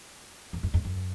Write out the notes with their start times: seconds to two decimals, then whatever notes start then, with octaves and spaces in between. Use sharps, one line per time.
0.53 F2
0.63 F#2
0.74 F2
0.85 F#2